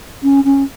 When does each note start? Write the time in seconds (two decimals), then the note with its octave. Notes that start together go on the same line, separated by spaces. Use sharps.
0.23 C#4
0.44 C#4